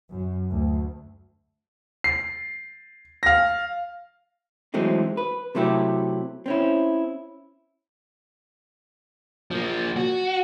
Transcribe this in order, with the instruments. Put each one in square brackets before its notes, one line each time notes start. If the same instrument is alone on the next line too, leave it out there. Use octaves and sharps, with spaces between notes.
[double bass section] F#2
D2
[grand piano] C7
F5 A#6
[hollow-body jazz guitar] E3 F#3 G#3 A3 C4 D#4
B4
C3 F#3 A3 E4 G4
C4 C#4 E4
[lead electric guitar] F3 A#3
F#4